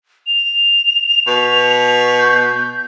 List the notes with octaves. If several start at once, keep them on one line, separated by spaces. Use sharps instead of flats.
F7
B2
G6